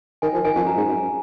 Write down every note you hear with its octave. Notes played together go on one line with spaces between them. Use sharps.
D#3 G#5
F3
D#3 G#5
F2
F#2 A#5
G#2
F#2